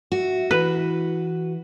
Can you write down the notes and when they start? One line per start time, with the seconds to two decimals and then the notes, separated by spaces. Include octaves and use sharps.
0.12 F#4 E5
0.51 E3 B4